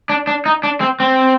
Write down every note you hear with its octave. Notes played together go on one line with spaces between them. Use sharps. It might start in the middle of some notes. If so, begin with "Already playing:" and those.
D4
D4
D#4
D4
C4
C4